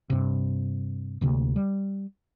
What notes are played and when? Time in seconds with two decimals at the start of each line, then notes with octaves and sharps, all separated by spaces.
0.10 G2 C3
1.21 D1 D2 C3 A#3
1.56 G3